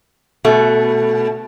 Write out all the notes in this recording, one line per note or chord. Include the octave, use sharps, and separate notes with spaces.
B2 A3